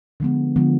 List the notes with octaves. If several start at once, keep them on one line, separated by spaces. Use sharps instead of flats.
D3 F3 G#3 B3
D3 F3 G#3 B3